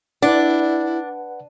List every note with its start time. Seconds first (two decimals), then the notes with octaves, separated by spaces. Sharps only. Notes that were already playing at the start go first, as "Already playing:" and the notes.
0.22 D4 E4 B4 D5 F#5